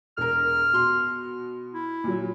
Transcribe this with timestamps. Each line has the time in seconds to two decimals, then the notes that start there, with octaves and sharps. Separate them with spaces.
0.18 E1 A#4 F6
0.73 B2 C6
1.74 E4
2.04 A#2 F#3